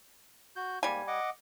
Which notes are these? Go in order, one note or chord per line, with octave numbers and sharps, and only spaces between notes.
F#4 G6
G#2 G3 A#3 G#5
D#5 F#5 D6